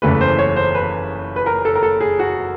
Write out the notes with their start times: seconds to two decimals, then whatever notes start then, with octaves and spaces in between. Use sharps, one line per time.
0.02 F#1 E2 C#3 E3 A3 B4
0.21 C5
0.39 C#5
0.56 C5
0.75 B4
1.36 B4
1.46 A#4
1.65 A4
1.75 A#4
1.83 A4
2.01 G#4
2.19 F#4